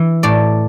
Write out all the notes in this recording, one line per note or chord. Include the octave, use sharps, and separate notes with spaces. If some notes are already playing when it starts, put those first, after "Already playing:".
Already playing: E3
A2 D5